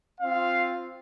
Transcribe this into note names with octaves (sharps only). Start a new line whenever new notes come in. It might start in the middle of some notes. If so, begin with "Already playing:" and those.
C4 F4 F5